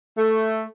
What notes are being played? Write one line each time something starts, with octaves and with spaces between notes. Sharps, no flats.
A3